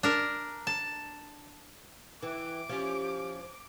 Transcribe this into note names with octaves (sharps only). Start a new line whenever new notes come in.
D4 A#4
A5
E3 G5 D6
F3 C#4 G4